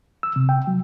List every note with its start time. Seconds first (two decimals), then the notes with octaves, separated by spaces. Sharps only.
0.23 E6
0.36 C3
0.49 G5
0.67 F#3